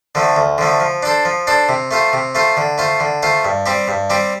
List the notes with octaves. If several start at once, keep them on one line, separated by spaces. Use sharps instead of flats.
D3 F3 A3
D2
D3 F3 A3
F3
D4 A4 C5
F3
D4 A4 C5
C3
A3 F4 C5
C3
A3 F4 C5
D3
A3 F4 C5
D3
A3 F4 C5
G2
G3 C4 G4
G2
G3 C4 G4